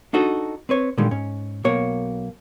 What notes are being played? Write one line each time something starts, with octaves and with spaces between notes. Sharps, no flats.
D4 D#4 F#4 A4 D#5
C4 B4 C#5
A#2 D3 D#3 G3 G#3
G#2 C#4
B1 B2 A#3 C#5